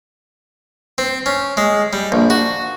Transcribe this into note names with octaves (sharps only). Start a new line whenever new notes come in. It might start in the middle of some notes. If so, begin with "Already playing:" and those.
C4
C#4
G#3
G3
A#1
F#4